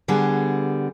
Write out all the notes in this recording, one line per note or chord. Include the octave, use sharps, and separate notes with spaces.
D3 G3 B3 G#4 A4